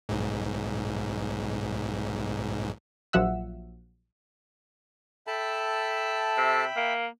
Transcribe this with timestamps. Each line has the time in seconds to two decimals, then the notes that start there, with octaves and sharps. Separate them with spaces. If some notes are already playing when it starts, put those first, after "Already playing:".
0.09 B1 G#2
3.13 A#1 F3 F#3 E5 F#5 E6
5.27 A4 E5 G5 A5 B5
6.37 C3
6.76 A#3